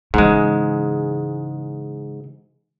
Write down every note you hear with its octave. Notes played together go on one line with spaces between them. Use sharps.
G#2 C#3 E3 G#3